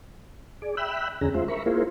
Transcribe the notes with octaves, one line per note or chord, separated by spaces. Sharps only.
G#4 D5
E5 G5 B5 E6 F#6
E2 D3 C#4 G#4 A#5
G#3 F4 C5 E5
A#4 E5 A#5 B5 C#6
A#3 E4 F4 G#4 A#4 C5